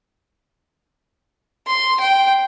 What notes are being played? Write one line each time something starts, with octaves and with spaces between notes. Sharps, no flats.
C6
G5